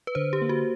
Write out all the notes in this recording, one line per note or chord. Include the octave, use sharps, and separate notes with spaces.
B4
D3 C5
G4
A#3
F#4